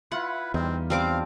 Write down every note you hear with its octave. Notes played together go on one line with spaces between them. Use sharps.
E4 F4 B4 F#5
E2 G3 C4 D#4
F3 G3 C4 F5 D6